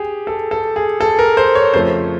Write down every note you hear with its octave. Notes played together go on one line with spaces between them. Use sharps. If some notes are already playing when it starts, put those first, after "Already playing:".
Already playing: G4 G#4
A4
A4
G#4
A4
A#4
C5
C#5
F2 C#3 F3 A3 C5